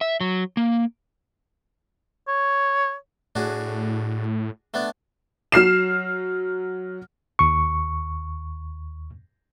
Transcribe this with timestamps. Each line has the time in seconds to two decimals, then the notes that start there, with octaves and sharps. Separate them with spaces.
0.01 E5
0.21 F#3
0.57 A#3
2.28 C#5
3.35 A2 D4 F#4 G#4
4.74 A3 B3 D4
5.52 F#3 F6 C7 E7
7.39 D#2 C#6